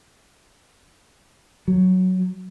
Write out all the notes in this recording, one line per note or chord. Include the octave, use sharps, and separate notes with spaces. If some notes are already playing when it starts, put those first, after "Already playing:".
F#3